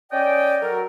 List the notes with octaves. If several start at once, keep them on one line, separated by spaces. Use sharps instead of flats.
C#4 D5 D#5 G5
F#3 A4 A#4